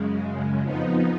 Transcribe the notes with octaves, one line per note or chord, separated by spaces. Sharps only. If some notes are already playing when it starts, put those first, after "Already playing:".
Already playing: F#2 C#3 G#3
F2 F3 B3 D#4